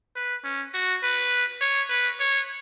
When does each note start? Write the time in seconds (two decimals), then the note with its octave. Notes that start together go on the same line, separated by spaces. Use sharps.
0.16 B4
0.44 C#4
0.74 F#4
1.03 B4
1.61 C#5
1.89 B4
2.20 C#5